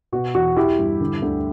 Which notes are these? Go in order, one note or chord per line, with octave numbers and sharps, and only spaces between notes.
B2 F#4
E2 F#4
E3 E4 G4
G2
D3
D2